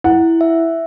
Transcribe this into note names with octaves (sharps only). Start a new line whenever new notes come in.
E4 F#5
E5